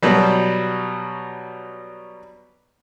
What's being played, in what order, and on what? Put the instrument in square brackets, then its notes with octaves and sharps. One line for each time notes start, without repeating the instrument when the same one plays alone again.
[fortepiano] B2 F#3 G3